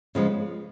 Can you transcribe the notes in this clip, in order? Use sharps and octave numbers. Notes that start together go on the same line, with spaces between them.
C#3 F3 G#3 B3